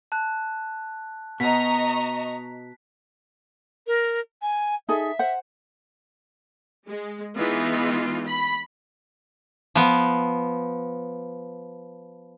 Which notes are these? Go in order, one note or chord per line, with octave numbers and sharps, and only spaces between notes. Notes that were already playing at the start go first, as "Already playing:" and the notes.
A5 F#6
B2 D#5 A#5 C#6 B6
A#4
G#5
D#4 G#4 A4 E5
C5 F#5
G#3
E3 G#3 B3 D#4 F4
B5
F3 B3